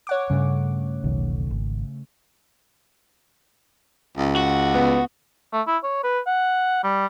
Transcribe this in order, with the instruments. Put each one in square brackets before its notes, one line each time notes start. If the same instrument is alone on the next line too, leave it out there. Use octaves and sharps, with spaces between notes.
[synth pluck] C#5 F#5 D6
[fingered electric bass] G2 [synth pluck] C#3 A3
[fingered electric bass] E1 B1 D#3
G#1
[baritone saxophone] C#2
[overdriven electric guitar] F#4
[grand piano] B3
[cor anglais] A3
E4
C#5
B4
F#5
G3